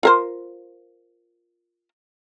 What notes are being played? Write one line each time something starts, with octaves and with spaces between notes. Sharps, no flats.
F4 A#4 C5